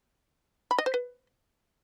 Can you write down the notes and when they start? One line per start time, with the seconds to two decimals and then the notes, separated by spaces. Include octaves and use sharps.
0.71 B5
0.78 D#5
0.86 C5
0.94 B4